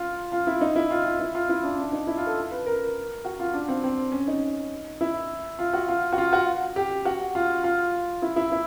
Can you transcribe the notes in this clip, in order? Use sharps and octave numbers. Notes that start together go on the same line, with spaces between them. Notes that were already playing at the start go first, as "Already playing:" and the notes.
Already playing: F4
F4
E4
D#4
E4
F4
F4
E4
F4
E4
D4
D4
D#4
E4
F4
A4
B4
A#4
F#4
F4
D4
C4
C4
C#4
D#4
E4
F4
F#4
F4
F#4
F4
F#4
G4
F#4
F4
F4
E4
E4
E4